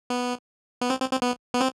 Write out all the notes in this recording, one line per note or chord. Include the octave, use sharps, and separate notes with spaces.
B3
B3
C4
C4
C4
B3
B3
C4